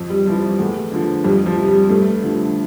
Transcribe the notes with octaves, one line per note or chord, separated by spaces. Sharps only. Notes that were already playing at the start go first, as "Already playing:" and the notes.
Already playing: F2
G3
C3 E3 F3
G3
E2 A3
D3 F3
F2 G3
F3
C3 F3
G3
G2 A3
D3 F3